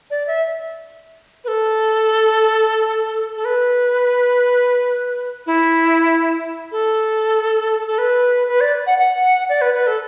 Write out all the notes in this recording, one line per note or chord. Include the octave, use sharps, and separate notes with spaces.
D5
E5
B4
A4
A4
B4
E4
A4
A4
B4
B4
D5
F#5
F#5
D5
B4
B4
A4